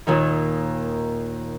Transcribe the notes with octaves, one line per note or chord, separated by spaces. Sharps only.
D#2 A#2 D#3